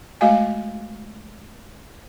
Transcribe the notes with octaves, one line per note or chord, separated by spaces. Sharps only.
G#3 A3 F#4 D#5 F5 G#5